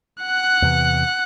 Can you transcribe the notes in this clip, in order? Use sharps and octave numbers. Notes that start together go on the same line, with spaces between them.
F#5 F#6
E2 C3 E3